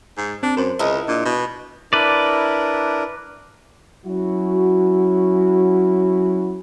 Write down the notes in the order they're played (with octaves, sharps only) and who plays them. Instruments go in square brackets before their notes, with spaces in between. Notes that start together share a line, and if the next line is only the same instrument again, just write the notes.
[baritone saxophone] G#2
[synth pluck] C4 [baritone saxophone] D4
[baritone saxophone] F#2 [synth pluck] A#4 C5
[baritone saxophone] C#2 [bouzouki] E4 D#5
[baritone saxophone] A#2 [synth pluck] D4
[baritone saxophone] B2
[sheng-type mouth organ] D4 E4 A#4 [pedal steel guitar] B4 D5
[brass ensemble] F#3 C#4 E4 F#4